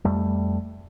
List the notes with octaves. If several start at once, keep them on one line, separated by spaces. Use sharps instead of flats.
F2 G3 A3